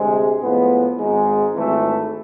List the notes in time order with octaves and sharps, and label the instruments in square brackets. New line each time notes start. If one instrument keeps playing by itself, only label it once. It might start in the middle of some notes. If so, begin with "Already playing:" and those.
Already playing: [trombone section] D2 C3 G#3 C4
A2 F3 G#3 B3
G#1 G#2 G#3
G#1 G#2 E3 A3